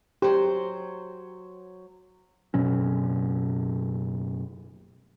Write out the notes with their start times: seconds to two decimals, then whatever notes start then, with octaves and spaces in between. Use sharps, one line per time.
0.22 F#3 G4 C5
2.54 F#1 B2 F#3 C#4